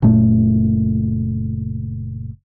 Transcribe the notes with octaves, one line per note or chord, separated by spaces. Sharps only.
F#1 A#2 A3